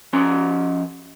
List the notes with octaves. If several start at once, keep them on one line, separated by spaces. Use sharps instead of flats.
F3 C#4 C6